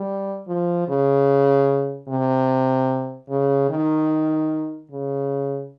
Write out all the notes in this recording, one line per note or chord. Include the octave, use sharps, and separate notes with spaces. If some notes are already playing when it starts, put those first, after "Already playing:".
Already playing: G3
F3
C#3
C3
C#3
D#3
C#3